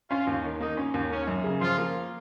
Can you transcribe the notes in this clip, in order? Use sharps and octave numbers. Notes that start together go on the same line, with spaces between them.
C#4 F4
D#2
D#3
A#3 D#4
C#4
D#2
A#3 C#4
F#2
C#3
F3 F4
A#3